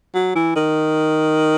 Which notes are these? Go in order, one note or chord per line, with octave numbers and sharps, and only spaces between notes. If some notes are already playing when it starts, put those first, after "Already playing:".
F#3
E3
D#3